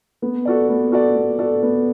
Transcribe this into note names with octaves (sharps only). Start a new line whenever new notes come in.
B3
F#4 A4 D5
B3
F#4 A4 D5
B3
F#4 A4 D5
B3